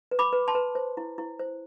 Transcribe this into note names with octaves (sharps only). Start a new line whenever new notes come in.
B4
B5 D6
B4
A5 C6
B4
C5
E4
E4
C5